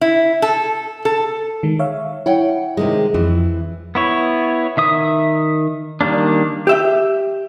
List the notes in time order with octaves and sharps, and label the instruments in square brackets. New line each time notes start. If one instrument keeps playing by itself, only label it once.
[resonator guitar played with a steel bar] E4
A4
A4
[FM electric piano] D#3 G#3
C#5 E5 F5
[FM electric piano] E4 [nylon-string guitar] C#5 F#5 G5
[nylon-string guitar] C3 D#3 G#3
[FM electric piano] F2 F3 [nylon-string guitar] E3
[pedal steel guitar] B3 E4 C#5
D#3 E5 D#6
D#3 G3 A#3 D4
[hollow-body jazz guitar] G4 E5 G5